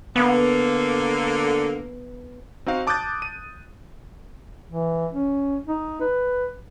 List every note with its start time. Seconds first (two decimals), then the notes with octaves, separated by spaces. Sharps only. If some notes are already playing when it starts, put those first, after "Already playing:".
0.16 D3 A#3 B3
2.66 C4 D#4 F#4 F5
2.87 A5 D6 D#6 F#6 G6 A6
3.22 D#7
4.70 E3
5.13 C#4
5.67 D#4
6.00 B4